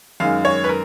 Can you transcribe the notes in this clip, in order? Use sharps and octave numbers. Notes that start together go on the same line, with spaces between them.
F#2 D#3 G#3 F5
C#5
B4
A#4